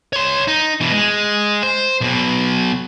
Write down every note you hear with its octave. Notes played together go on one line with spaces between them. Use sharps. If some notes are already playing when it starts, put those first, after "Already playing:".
C#5 C6
D#4
B2 E3
G#3
C5
B1 B2